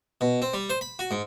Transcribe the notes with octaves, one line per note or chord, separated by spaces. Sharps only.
B2
C4
G3
C5
B5
F#4
G#2